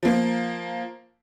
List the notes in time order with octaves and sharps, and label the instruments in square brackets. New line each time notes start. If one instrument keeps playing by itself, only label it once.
[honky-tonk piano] F3 A#3